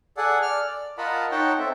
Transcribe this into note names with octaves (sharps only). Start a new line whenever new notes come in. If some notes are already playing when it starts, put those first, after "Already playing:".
G#4 A4 D5 F#5
D5 F6
D5
F4 A#4 D#5 F#5 A5 B5
D#4 C#5 F#5 G5 A5
C4 A4 E5